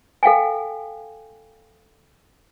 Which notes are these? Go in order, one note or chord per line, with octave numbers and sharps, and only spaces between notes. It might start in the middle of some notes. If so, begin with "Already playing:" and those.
A4 F5 G5 G#5